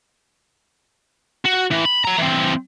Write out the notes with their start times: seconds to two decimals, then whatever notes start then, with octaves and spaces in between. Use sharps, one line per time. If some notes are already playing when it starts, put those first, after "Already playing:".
1.46 F#4
1.71 A2 E3
1.85 B5
2.04 F#3 A#5
2.18 E3 C4